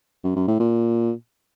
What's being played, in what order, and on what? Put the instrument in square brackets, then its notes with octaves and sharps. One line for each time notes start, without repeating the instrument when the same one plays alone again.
[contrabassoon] F#2
F#2
A2
A#2